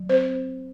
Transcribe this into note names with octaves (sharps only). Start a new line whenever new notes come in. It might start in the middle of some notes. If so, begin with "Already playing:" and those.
Already playing: F#3
C4 C5